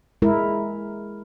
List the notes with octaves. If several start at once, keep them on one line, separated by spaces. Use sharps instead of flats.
G#3 E4 A#4